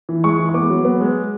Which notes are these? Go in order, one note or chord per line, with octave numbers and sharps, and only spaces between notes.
E3
G#3 C#6
E3
C#6
B3 D6
F#3
B3
G#3